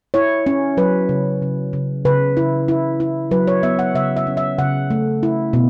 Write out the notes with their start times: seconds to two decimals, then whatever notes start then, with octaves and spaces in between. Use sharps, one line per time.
0.14 E4 C#5
0.46 C#4
0.77 F#3 B4
1.09 C#3
1.42 C#3
1.73 C#3
2.05 C#3 B4
2.37 E4
2.68 E4
3.00 E4
3.31 F#3 B4
3.48 C#5
3.63 B3 E5
3.79 F#5
3.95 C#3 E5
4.17 E5
4.27 C#4
4.37 E5
4.58 C#3 F#5
4.90 A3
5.23 E4
5.53 B2